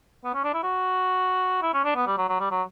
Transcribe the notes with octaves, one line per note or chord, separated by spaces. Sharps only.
B3
C#4
D4
E4
F#4
E4
C#4
D4
B3
G3
F#3
F#3
G3
F#3